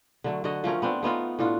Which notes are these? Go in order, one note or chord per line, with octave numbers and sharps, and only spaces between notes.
D3 F#3 A3
D3 F#4 D#5
F3 A3 C#4 A#4
B3 C4 D4
A3 B3 D#4 F4
A2 D4 F4 F#4